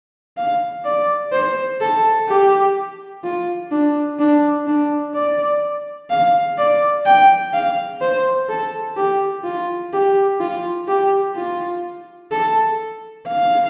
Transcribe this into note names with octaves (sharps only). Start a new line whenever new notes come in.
F5
D5
C5
A4
G4
F4
D4
D4
D4
D5
F5
D5
G5
F5
C5
A4
G4
F4
G4
F4
G4
F4
A4
F5